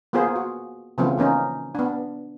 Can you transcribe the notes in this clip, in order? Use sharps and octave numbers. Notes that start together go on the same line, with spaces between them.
A#3 B3 F4 G#4 C5
F#4
C#3 E3 F3 A3 B3 C4
E3 A#3 C#4 D#4
B3 D4